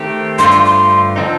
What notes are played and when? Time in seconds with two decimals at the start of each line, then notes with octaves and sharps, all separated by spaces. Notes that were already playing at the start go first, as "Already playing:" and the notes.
Already playing: D#3 A3 C4 G4
0.39 G2 D3 A3 C4 F4 C6
0.52 C6
0.65 C6
1.16 D3 F3 C4 D#4